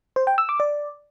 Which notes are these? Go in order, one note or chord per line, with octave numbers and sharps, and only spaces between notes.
C5
G5
E6
D6
D5